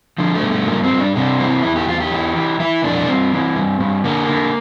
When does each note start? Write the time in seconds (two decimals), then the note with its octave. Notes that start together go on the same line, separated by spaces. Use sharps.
0.18 D3 F3
0.35 A3
0.43 G2
0.51 A3
0.68 G2 A#3
0.83 C4
0.91 G2
0.99 D4
1.15 C3 D4
1.40 E3 C4
1.63 E2 E4
1.76 G4
1.88 E2 F4
2.00 G4
2.11 E3
2.36 E3
2.60 E3 E4
2.84 F2 D4
3.08 G2 C4
3.33 E3
3.56 G2
3.80 G2
4.04 D3 A#3
4.28 D3